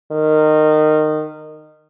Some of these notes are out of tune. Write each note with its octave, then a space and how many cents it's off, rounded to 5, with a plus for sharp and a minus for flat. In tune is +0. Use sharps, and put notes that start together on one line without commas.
D#3 -20